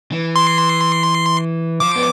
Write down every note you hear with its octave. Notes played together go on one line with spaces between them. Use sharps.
E3
C6
F3 D6
B3